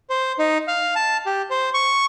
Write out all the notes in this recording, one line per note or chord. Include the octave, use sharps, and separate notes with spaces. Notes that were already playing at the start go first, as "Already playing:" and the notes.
C5
D#4
F5
A5
G4
C5
C#6